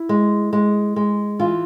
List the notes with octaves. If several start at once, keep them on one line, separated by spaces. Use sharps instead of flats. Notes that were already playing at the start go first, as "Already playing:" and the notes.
Already playing: E4
G#3
G#3
G#3
E3 F4